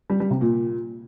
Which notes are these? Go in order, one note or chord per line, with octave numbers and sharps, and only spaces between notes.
G3
G3
C3
A#2